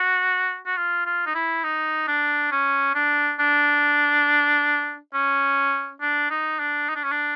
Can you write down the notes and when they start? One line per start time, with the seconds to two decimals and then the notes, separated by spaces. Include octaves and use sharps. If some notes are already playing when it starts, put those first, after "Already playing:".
Already playing: F#4
0.66 F#4
0.77 F4
1.06 F4
1.26 D#4
1.35 E4
1.64 D#4
2.08 D4
2.52 C#4
2.95 D4
3.39 D4
5.14 C#4
6.01 D4
6.30 D#4
6.59 D4
6.89 D#4
6.96 D4
7.04 C#4
7.11 D4